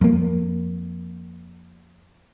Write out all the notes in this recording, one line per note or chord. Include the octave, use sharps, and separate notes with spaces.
F2 A#3